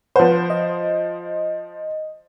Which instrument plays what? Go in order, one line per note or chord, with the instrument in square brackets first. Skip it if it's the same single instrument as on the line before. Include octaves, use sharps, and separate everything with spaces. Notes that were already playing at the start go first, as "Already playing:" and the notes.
[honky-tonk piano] F3 C5 [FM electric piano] B4 F#5
[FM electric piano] D#5